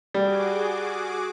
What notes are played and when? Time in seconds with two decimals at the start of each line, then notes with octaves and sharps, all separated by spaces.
0.14 G3 F#4 G#4 D6